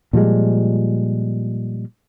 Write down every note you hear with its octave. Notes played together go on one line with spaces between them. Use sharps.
A#2 F3 G3 G#3